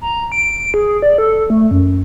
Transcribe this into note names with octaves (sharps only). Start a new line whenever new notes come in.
A#5
D7
G#4
D5
A4
A3
F#2